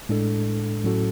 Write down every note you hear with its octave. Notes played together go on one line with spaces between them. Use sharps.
A2 G#3 D4 A4
A2 F#3 C#4 F#4 A4